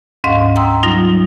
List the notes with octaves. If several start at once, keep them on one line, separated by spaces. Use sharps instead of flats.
D2 G#2 C#4 D#5 F5
G5 A#5 C6 D#6 E6
F#3 G3 D#4 F4